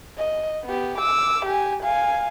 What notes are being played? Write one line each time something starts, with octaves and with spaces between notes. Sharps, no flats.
D#5
B3 G4
D6 E6
G4 G#5
F5 G#5